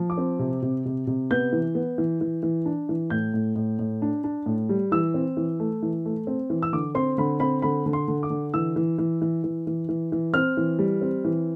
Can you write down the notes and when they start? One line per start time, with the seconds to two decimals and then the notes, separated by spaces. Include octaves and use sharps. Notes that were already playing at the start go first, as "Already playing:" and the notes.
Already playing: F3
0.10 D6
0.18 C4
0.39 C3
0.62 C3
0.85 C3
1.07 C3
1.31 B3 G6
1.52 E3
1.75 B3
1.98 E3
2.21 E3
2.43 E3
2.66 D4
2.89 E3
3.10 A2 G6
3.34 A2
3.56 A2
3.79 A2
4.02 D4
4.24 D4
4.46 A2
4.69 G3
4.92 E3 E6
5.14 C4
5.37 E3
5.60 A3
5.83 E3
6.05 A3
6.27 C4
6.50 E3
6.62 E6
6.73 D3 D6
6.95 C4 C6
7.18 D3 B5
7.40 C4 B5
7.62 D3 B5
7.86 D3
7.93 C6
8.08 D3
8.23 D6
8.30 D3
8.54 E3 E6
8.76 E3
8.98 E3
9.22 E3
9.44 E3
9.67 E3
9.89 E3
10.12 E3
10.34 C4 F6
10.57 E3
10.79 G3
11.01 C4
11.25 E3